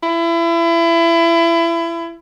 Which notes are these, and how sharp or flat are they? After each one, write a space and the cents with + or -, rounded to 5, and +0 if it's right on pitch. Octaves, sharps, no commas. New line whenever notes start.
E4 +30